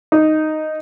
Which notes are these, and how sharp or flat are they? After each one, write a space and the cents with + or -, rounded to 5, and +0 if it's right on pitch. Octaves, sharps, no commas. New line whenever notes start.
D#4 -5